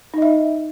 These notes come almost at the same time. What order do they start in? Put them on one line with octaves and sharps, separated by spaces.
D#4 D#5 E5